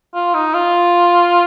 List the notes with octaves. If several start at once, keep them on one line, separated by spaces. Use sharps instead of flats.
F4
D#4
F4